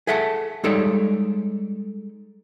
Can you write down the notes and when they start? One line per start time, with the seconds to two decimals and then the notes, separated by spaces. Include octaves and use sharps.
0.07 G#4 A4 E5 F#5 G5 A5
0.64 G3 G#3 D#4 A4 C#5 D5